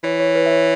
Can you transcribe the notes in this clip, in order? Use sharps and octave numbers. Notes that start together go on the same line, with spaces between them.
E3 C#5
C#5
B4
E5
C#5